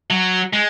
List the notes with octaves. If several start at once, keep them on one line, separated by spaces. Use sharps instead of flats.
F#3
G#3